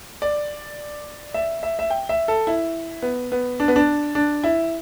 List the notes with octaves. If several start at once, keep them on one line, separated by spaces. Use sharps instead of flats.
D5
E5
E5
E5
G5
E5
A4
E4
B3
B3
D4
B3
D4
D4
E4